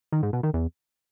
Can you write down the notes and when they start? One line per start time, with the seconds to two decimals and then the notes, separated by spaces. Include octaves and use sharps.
0.12 D#3
0.23 G#2
0.33 B2
0.43 D#3
0.54 E2